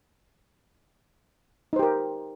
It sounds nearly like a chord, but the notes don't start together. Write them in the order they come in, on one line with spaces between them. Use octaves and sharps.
D#4 C5 G4 A#4